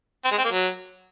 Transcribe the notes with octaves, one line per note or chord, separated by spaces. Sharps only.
C4
G#3
C4
A#3
F#3